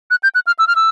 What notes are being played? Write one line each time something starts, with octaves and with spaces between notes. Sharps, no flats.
F#6
G6
F#6
F6
E6
F6
E6